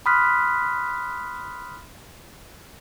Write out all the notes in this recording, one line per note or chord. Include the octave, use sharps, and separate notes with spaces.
B5 C6 D#6 F6 F#6 B6